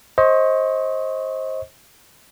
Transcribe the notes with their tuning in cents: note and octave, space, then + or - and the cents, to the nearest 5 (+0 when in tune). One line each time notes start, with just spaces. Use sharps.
C5 +20 D#5 +25 C#6 +0